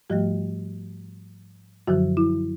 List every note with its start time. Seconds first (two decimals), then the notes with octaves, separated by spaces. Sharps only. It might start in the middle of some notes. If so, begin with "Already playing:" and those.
0.10 G#2 F3 G3 A3 G4
1.87 F#2 D3 F3 F#3 F#4
2.17 E4